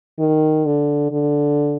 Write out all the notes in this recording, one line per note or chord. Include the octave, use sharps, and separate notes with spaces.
D#3
D3
D3